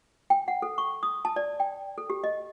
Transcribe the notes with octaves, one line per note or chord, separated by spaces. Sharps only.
G5
F#5
A4
C#6
D#6
A5
D5
G5
A4
G4
D#5